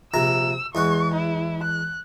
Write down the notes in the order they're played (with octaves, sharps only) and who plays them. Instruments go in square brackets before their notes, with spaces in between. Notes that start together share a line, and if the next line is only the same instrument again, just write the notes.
[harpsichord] A#1 C3 A#5 [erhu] E6
[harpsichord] E2 G#3 F#5 [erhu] C#6
[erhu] E4
F#6